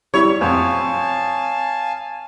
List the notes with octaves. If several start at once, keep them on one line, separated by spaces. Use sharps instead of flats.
G3 E4 C#5
F2 F5 G#5 A5